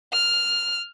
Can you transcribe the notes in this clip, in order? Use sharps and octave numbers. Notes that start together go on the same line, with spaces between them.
F6